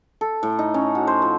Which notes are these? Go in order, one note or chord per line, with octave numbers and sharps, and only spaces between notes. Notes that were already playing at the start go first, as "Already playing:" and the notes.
A4
A2
D#4
C#4
F#4
C5
F3